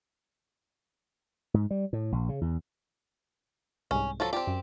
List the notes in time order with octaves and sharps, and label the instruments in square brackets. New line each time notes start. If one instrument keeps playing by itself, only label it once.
[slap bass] G#2
G3
A2
A#1
C#3
E2
[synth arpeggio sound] C2 G#2 [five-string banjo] C#4
[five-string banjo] F3 F#3 A4
[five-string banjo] C4 G4 [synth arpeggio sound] F4 D5 A5
[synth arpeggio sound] F#2